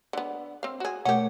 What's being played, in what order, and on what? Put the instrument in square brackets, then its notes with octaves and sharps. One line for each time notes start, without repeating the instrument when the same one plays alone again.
[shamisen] D3 B3
C4 F5
F#4 G#4
[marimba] B2 A3 A#4 [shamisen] C#4 G4 [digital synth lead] F#5